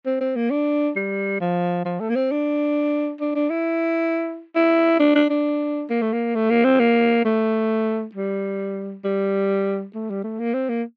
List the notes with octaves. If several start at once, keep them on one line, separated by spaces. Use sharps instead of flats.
C4
C4
A#3
D4
G3
F3
F3
A3
A#3
C4
D4
D4
D4
E4
E4
D4
D4
D4
A#3
A3
A#3
A3
A#3
C4
A#3
A3
G3
G3
A3
G3
A3
A#3
C4
A#3